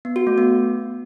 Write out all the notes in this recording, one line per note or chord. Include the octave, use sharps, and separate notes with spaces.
B3
F#4
A3
B3